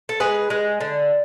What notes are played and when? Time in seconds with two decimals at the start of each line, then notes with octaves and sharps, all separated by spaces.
0.09 A4
0.20 G#3 G#4 B4
0.50 G#3
0.81 D3